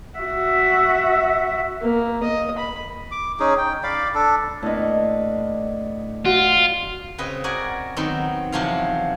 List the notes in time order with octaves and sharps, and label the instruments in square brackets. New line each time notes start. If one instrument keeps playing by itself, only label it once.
[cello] F#4 E5
[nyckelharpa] A#3
D#5
B5
[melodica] D6
C#4 D#4 G#4
G5
D5 F5 B5 D6
D4 A4
[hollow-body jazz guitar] A2 A#3 B3 [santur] D4 D#5
[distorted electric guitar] F4 [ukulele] F#4
[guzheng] C#3 C4 B4 D#5
F#4 A#4 D5 G#5
D#3 F#3 B3 C4
E2 C3 F3 F#3 F4 F5